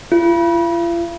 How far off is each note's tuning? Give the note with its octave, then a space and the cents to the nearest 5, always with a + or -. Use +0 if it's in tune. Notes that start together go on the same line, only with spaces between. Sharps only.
F4 -45